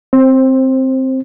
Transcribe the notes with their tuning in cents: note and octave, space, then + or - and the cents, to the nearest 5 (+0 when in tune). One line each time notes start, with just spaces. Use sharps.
C4 +0 C5 +20